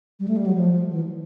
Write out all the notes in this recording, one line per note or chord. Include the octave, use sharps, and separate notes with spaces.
G3
A3
G3
F#3
F3
E3